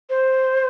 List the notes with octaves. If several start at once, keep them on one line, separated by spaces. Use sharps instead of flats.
C5